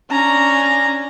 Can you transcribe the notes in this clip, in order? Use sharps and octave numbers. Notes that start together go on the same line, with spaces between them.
C#4 D4 A#5